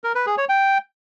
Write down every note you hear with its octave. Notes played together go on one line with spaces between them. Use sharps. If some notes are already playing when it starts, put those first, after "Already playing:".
A#4
B4
G#4
C#5
G5